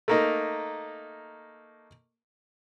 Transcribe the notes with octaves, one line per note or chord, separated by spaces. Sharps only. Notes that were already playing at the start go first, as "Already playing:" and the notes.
A3 A#3 D#4